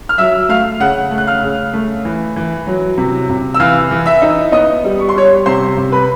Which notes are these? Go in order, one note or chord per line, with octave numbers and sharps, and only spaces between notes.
F6
F#3 E5 E6
A3 F5 F6
C#3 F#5 F#6
A3
F#6
F5 F6
C#3
A3
E3
E3
F#3
C3
C3
E6
E3 F5 F6
E3
E5 E6
D#4
B3 D#5 D#6
G3
C#6
C6
G3 C#5 C#6
C3 C5 C6
C3
B4 B5